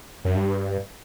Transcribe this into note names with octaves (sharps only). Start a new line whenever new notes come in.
F#2
G2